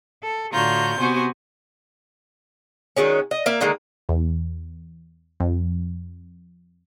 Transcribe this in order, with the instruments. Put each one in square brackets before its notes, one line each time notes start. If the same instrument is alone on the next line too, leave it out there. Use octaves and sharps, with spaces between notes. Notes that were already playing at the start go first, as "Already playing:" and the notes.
[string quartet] A4
A2 D3 F4 F#4 A#5 G6
C3 B3 F#4 C5 G#5
[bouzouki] D#3 F#3 G#3 C#4
D#5
A#3 E5 F5
D3 D#3 G#3 A#3
[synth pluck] E2
F2